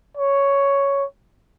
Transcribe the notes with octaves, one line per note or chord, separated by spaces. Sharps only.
C#5